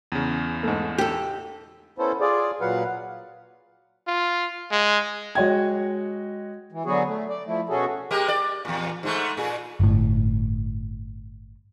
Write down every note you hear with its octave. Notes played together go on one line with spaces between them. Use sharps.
E2 C#3
G#2 A3
G4 A4
B3 C#4 E4 A4 C5
F4 G#4 D5
A#2 F#3 B4 F5 F#5
F4
G#3
G#3 F#4 C#5 D#5 G5 G#6
E3
D3 F#3 B3 F#4 G#4
A3
D5
F3 A3 E4
B2 C#4 F#4 G#4 A4
G#3 G4 A#4
D5
E2 A#2
G#2 G#3 A3
A#2 G#4
G1 A2